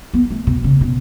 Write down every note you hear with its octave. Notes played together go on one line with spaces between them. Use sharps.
B3
A3
B2
C#3
B2